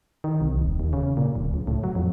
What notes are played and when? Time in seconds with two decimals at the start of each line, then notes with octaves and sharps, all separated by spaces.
0.24 D#3
0.41 C2
0.61 D#1
0.80 D#2
0.93 C#3
1.17 A#2
1.35 D1
1.54 C#2
1.67 A2
1.84 F#3
1.95 F2